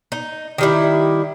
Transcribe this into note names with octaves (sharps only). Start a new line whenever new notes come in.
D#4
D#3 G3 E4